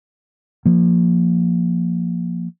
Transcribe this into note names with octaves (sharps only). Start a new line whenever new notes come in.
F3 A#3